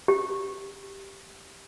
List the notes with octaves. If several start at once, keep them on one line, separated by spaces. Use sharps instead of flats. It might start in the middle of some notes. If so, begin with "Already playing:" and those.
G4